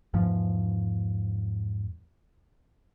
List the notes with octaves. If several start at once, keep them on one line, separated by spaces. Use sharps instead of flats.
E2 G#2 F3